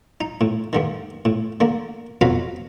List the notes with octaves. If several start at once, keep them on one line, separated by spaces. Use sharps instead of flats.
D#4
A2
G2 D3 D#3
A2
D3 A#3
F2 B2 F#3 B4 F5